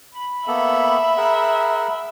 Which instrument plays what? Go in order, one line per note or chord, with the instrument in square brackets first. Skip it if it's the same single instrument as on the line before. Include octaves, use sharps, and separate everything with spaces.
[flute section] B5
[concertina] A#3 B3 A4 [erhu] E5
[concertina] G#4 A#4 F#5